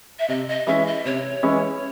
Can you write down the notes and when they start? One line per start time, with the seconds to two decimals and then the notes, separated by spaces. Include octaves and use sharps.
0.19 E5
0.28 C3 D#5
0.48 D#5
0.66 E3 G#3 C#4 E4 E5
0.86 D#5
1.05 C3 C#5
1.43 E3 G#3 C#4 E4